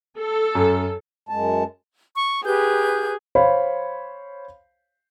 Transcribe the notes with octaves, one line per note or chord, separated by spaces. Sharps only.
A4
F#2
F#2 G#3 A5
C#6
G4 G#4 B4 G6
C5 C#5 F5 B5